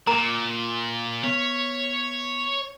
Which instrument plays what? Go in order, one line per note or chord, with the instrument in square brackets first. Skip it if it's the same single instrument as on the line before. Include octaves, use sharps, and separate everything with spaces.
[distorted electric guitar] A#2 [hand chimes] A#4 [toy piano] A#5
[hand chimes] B3 B6 [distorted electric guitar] C#5